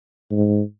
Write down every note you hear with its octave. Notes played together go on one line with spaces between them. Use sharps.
G#2